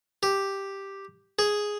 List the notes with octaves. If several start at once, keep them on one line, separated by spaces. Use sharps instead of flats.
G4
G#4